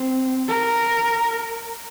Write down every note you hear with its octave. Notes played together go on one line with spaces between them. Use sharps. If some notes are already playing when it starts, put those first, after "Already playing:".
Already playing: C4
A#4